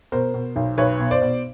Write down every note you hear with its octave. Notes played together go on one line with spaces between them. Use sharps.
B2 A#4 C5
B2
B1
B1 B4 C#5
B2
C5 D5
B2